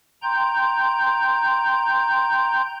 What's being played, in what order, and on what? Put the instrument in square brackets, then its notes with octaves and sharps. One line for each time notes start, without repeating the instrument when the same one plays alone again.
[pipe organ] G5 A#5 C6 G6